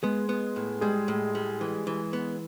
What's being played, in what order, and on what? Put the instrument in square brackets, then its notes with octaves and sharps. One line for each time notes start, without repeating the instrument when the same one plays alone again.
[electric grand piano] G#3 G#4 [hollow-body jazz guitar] B3
[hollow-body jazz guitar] B3
A2
[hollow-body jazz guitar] G3 [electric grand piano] G#3 G#4
[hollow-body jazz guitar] A2
G3
E3
E3
B3